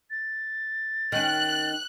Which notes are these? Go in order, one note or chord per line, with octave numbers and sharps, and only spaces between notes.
A6
D#3 C#4 F#6